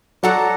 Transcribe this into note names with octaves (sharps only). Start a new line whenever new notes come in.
F#3 F#4 A4 D5 F#5 A#5